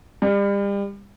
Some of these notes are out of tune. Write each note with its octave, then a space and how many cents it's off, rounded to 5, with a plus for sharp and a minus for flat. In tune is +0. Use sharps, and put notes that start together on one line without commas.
G3 +35